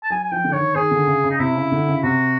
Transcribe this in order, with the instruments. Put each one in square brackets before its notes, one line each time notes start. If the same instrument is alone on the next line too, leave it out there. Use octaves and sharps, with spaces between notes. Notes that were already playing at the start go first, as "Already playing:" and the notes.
[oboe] A5
[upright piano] F#3 [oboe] G#5
[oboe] G#5
[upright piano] F3 [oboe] G5
[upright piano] D3
[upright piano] D#3 [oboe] C#5
[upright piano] D#3 [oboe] G#4
[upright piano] D3
C#3
C#3
[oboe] D#4
[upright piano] C3 [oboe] E4
[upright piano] C#3
D3
C#3
[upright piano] C3 [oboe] F#4